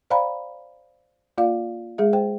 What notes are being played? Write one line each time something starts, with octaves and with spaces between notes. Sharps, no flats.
C5 D5 F5 G5 A#5 B5
A#3 F4 D5 F5
G#3 G#4 E5
C5 G5